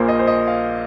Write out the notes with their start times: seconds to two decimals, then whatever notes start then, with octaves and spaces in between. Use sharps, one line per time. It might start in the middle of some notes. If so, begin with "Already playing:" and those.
Already playing: A#1 A#2 A#3 C5
0.08 D#5
0.19 C5
0.27 D#5
0.48 F5